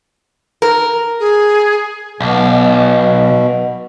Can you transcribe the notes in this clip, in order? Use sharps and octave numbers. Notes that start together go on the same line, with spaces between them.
A#4
G#4
B1 B2